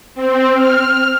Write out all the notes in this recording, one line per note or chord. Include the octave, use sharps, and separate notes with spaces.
C4
F6